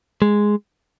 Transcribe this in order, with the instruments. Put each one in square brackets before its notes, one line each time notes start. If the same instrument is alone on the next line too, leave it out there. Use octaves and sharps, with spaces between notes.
[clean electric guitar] G#3